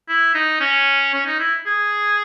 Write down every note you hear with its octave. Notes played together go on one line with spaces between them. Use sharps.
E4
D#4
C#4
C#4
D#4
E4
G#4